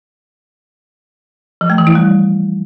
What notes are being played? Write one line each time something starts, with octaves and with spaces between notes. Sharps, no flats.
F3
A3
E3
E4
G3